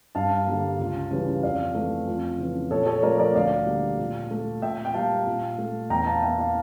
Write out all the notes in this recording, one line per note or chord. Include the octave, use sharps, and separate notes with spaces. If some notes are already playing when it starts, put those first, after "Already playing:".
G2 F5 A5
D3 G3 A#3
C#2
C#3 E3 G3
F2 D5 F5
E3 A3
F2
C#3 E3
A#2 A4 C#5
A4 C#5
F3 A3 A#4 D5
A#4 D5
D2 D5 F5
D3 G3 A#3
A#2
A3
A#2 E5 G5
G5
G3 A#3 F5 A5
A#2
A3
E2 G5 A#5
F5 A5
E3 A#3 E5 G5
F5 A5